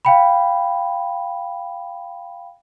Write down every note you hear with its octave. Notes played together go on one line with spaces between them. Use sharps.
F5 G5 B5